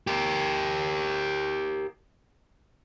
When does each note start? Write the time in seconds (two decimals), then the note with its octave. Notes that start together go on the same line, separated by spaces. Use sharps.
0.07 G4 A#4